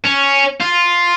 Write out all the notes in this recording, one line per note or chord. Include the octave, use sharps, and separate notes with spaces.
C#4
F4